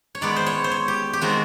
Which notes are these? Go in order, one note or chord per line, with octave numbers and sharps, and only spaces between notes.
C#5
D#3 G#3 B3 D5
C5
C#5
C5
C#5
G4
G4
D#3 G#3 C4 F4 F#4